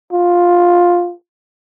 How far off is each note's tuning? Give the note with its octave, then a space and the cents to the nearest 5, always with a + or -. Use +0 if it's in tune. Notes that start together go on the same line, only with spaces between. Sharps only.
F4 +10